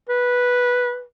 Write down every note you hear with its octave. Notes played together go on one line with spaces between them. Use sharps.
B4